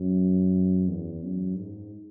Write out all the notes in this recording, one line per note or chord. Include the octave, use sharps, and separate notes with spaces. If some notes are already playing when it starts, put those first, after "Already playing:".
Already playing: F#2
E2
F#2
G#2